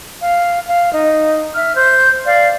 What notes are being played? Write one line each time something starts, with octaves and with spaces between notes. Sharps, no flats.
F5
F5
D#4
E5 F6
C5 G6
D5 F5